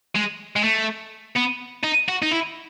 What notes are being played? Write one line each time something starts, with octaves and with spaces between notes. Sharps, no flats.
G#3
G#3
A3
B3
D#4
F#4
D#4
E4